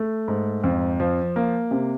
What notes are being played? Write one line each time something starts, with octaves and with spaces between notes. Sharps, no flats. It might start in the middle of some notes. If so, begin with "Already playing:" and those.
Already playing: A3
G#2
F2
F3
A#3
C3